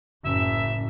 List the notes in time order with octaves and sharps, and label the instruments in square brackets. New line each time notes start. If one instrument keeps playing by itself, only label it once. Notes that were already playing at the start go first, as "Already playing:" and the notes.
[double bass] F#1 [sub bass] A2 [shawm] E5